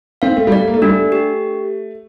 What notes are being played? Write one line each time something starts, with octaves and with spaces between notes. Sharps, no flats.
C4 F5
A3
G3
A3 D5
A#3
A3
G3 D4
A3
G4